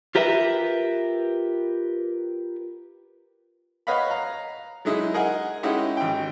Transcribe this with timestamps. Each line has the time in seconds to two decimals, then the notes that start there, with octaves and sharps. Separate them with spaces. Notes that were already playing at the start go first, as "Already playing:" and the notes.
0.15 F4 G4 A#4 B4 E5
3.87 B4 C#5 D#5 F5 F#5 B5
4.10 F5 A#5
4.85 F#3 G#3 D#4 E4
5.14 G#4 A#4 D#5 F#5 G#5
5.63 G#3 C#4 D#4 E4 G4 F#5
5.97 G#1 G5